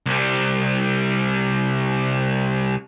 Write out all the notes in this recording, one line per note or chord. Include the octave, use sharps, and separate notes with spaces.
C2 G3